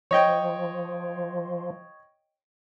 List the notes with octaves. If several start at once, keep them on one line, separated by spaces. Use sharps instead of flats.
F3 C#5 D#5 G5